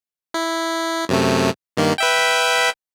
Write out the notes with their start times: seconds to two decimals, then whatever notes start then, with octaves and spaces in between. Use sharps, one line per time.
0.34 E4
1.09 F#2 C3 A3
1.77 G2 D#3 A#3
1.98 B4 E5 G5